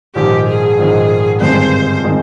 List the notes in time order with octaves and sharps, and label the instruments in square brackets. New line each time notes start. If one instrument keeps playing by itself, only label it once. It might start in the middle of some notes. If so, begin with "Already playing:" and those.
[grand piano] A#1 G#2 D#3 [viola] G4
[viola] G#4
[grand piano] A#1 G#2 D#3
[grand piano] G1 G2 D#3 G#3 C4 [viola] C5
[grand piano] D#3 G#3 C4